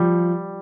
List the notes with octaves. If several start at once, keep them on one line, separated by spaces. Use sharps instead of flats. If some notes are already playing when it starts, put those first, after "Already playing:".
Already playing: F3 G3